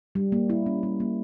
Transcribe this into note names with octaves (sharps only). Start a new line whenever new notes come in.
G3
A#3
E4
C#4
G3
A#3